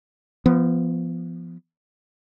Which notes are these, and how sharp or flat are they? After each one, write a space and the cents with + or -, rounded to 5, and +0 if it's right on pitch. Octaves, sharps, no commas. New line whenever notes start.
F3 -25 B3 -5